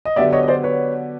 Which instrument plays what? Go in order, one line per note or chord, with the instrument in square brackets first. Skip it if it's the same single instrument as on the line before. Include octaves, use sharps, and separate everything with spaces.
[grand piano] D#5
[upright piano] D3 F#3 B3 D4 G4 [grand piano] D5 E5
[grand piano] C#5 D#5
D#5
C5 D5
B4 C#5